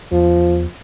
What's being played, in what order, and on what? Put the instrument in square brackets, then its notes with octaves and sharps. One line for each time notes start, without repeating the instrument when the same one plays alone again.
[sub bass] E2 [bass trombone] F3